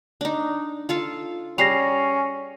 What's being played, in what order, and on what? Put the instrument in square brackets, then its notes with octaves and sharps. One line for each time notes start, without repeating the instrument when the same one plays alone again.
[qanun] D4 D#4
F4 A4 F5
[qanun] G3 G#4 [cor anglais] C#4 [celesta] A#6 C7 F7